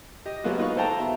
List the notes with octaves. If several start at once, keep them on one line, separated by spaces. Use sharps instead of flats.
G4 D#5
F#3 G#3 A#3 B3 F4 F#4
D#4 B4 F5 C#6
A4 C5 F5 G5 A5 A#5
B2 E5